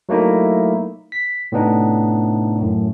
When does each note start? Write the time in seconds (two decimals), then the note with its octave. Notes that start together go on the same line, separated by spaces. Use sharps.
0.09 F#3 A3 A#3 D#4 E4
1.12 B6
1.52 A2 C3 B3 D4 D#4
2.59 F#2 A2